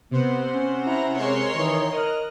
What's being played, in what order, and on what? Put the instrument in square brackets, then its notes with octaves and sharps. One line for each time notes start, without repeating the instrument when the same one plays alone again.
[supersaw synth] C3 C5 F#5 [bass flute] B3
[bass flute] C#4
[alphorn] E4 [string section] A#5
[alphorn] G#3 [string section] A#4 C#5 C6
[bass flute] D#3 [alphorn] E3
[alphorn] A#4 [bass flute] D#5 [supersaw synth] D#6 F6 F#6